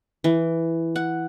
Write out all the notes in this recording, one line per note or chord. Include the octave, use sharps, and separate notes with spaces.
E3
F#5